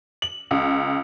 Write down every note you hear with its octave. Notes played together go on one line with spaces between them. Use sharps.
F#7
C#2